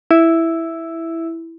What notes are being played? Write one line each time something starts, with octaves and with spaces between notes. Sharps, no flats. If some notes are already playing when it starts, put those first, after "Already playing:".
E4